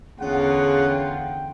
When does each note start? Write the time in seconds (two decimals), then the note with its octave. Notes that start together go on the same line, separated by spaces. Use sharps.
0.20 E2 D3 C#4 F4 G#4 F#5
0.89 G5